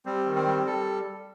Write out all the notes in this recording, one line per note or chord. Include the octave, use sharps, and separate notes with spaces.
G3 C4
D#3
C4
G3
G3 A4